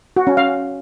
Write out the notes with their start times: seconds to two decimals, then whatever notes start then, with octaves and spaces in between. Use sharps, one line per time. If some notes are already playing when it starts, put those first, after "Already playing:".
0.16 F#4
0.27 C#4
0.37 F5